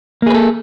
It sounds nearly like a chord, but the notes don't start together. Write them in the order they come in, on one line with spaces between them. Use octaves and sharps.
A#3 G#4 B4 A4